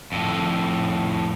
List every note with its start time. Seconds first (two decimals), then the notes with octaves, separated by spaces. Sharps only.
0.12 F2 A2